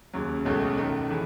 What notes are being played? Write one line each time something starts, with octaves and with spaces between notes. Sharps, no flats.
D#2 C#3 F#3
C#2 B2 A3 C#4 G#4
F#2 D#3 A3
C#3 E3